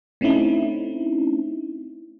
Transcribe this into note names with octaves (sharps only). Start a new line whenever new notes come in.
A3 C4 C#4 D#4 E4